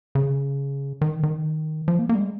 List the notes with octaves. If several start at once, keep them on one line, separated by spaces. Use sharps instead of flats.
C#3
D#3
D#3
F3
A#3
A#3
G3
G#3